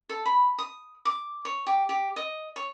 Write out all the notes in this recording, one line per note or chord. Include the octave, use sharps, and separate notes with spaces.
A4
B5
D#6
D6
C#5
G4
G4
D#5
C#5